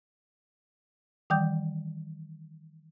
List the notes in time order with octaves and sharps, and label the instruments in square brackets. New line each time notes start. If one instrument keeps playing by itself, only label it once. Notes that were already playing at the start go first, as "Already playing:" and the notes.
[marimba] D#3 E3 G3 G5 D6 G6